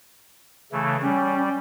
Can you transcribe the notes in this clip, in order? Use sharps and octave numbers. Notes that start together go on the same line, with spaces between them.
C#3 E3 A3
G3 C#4